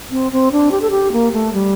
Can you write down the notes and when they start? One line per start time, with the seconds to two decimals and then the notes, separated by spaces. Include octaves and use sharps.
0.11 C4
0.32 C4
0.52 D4
0.71 G4
0.82 A4
0.91 G4
1.12 A#3
1.32 A3
1.53 G3